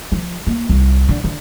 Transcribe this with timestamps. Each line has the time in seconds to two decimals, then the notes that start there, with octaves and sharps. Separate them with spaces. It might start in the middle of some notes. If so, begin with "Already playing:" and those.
0.12 F3
0.47 A#3
0.70 C2
1.09 D3
1.24 D3